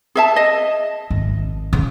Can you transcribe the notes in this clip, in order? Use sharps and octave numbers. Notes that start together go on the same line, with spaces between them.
G#4 E5 A5
D#5
G#1
C#3